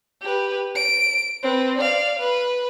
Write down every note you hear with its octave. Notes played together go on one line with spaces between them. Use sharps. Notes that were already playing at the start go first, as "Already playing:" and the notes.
G4 B4
D7
C4 B4
D5 F5
B4